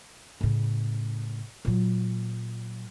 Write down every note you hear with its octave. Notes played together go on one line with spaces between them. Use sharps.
A2 C#3
A#2 F#3